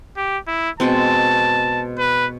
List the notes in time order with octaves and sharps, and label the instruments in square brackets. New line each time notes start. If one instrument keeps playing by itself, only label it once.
[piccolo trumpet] G4
E4
[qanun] B2 G#3 C4 [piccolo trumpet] A5
[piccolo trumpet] B4